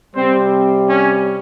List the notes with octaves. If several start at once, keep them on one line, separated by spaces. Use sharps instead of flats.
C3 G3 C4
C#4